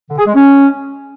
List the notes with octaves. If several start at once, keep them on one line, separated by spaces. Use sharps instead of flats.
D3
G#4
G#3
C#4